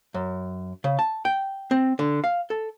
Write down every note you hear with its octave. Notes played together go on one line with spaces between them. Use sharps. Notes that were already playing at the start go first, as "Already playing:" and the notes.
F#2
C#3
A5
G5
C4
D3
F5
A4